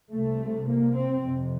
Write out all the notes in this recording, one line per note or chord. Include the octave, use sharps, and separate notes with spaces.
C2 C3 A3
A#3
C4
F2 C3